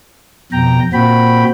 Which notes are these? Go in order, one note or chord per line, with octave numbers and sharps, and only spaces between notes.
F2 B2 G5 A#5
A#2 C4 F#4 G5 B5